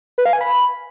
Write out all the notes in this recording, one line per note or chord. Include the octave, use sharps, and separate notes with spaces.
B4
F5
G#5
B5